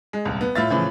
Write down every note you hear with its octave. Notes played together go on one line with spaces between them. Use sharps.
G#3
D#1 C2
B3
A2 F4 E5 A6
A2 C#3 E3 F3